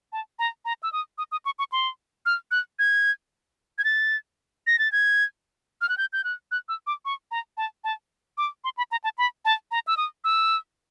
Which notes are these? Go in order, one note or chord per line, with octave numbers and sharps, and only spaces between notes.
A5
A#5
A#5
E6
D#6
D#6
D#6
C#6
C#6
C6
F6
F#6
G#6
G#6
A6
A#6
A6
G#6
F6
F#6
G6
G6
F#6
F#6
E6
D6
C#6
A#5
A5
A5
D6
C6
B5
A#5
A5
B5
A5
A#5
E6
D#6
E6